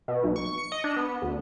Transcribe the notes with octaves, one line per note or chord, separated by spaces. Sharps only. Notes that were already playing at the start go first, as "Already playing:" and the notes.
B2
B1
C#6
C#7
D#5
D4
B3
D2